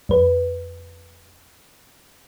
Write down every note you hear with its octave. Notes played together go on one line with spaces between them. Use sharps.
F2 B4